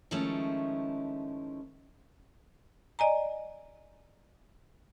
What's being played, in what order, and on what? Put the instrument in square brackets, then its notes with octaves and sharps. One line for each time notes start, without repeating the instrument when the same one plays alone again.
[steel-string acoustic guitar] D#3 F3 G#3 A3 C#4 E4
[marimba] D5 D#5 G#5 A#5